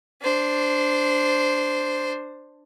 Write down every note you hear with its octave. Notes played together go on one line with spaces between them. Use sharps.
D4 C5